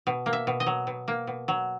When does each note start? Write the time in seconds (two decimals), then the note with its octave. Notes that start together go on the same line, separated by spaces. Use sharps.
0.07 B2
0.26 A#3
0.33 E5
0.47 B2
0.60 D#5
0.66 F#3
0.87 B2
1.08 A#3
1.27 B2
1.48 F#3